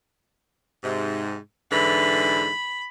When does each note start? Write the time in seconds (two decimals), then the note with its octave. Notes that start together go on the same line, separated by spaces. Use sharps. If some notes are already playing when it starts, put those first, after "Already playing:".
0.84 G#2 C3
1.71 G#2 D3 E3 B5